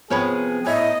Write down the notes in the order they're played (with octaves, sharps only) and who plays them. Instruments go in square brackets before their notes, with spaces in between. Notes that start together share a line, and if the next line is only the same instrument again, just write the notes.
[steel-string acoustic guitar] C3 F3 B3 [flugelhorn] G#4 [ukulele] A#4 C#5 B5
[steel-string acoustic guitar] A2 [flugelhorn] E4 [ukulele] C#5 E5 [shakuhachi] D#5